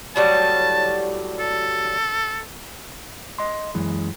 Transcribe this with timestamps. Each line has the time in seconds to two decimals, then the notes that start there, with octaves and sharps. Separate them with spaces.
0.16 A2 F#3 G3 A5
1.39 A4
3.38 D#5 C6
3.75 F#2 E3 G#3